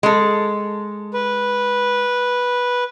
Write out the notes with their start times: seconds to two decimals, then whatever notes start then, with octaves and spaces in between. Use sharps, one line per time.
0.03 G#3 A4
1.14 B4